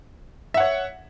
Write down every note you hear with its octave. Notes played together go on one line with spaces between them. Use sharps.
C#5 E5 F#5